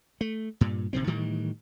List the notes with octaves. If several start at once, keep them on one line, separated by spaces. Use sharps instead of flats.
A3
G2 A#2
A#1 C3 D#3 C4
A2 D#3 E3 G3